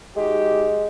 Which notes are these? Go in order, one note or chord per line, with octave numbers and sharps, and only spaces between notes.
G#3 D#4 F#4 G4